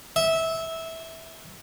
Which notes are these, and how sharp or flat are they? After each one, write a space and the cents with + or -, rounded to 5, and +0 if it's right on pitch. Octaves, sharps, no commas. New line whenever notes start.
E5 -15